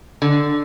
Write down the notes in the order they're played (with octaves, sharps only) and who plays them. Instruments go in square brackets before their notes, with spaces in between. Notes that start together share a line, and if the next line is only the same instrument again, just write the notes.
[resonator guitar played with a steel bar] D3